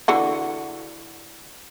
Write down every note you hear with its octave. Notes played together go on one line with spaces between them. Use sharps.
D3 E3 F#4